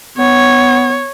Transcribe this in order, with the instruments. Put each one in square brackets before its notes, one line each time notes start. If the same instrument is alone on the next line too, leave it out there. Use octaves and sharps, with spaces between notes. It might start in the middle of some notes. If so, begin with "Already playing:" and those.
[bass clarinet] B3 [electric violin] C#5